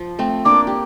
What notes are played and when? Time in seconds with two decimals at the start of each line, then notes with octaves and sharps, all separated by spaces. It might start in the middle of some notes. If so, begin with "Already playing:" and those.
Already playing: F3
0.19 A3 C4
0.45 A#3 D4 D6
0.67 G4